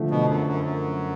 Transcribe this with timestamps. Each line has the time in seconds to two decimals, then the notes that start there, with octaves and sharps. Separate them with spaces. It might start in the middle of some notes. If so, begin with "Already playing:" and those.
Already playing: D3 F3 A3
0.11 B2
0.29 F#2
0.47 F#2
0.64 F#2